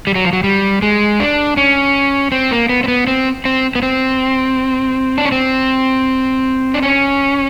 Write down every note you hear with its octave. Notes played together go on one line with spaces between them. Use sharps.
G3
F#3
F3
F#3
G3
G#3
D4
C#4
C4
A#3
B3
C4
B3
C4
C4
B3
C4
D4
C#4
C4
D4
C#4